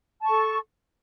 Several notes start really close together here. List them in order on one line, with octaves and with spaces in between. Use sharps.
A5 C#6 A4